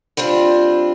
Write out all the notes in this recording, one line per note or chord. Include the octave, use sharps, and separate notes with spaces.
G3 C4 D4 F4